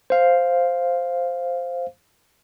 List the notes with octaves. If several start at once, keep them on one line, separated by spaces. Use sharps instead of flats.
C5 F5